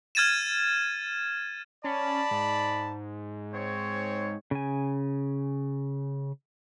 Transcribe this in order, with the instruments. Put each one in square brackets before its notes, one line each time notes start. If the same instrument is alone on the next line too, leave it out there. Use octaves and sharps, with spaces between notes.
[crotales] F6 G#6 A6 D#7 E7
[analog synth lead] C#4 [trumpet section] D5 A5 B5
[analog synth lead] G#2
[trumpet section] C4 C#5
[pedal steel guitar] C#3 G#5